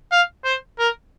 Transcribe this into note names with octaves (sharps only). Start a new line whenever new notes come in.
F5
C5
A#4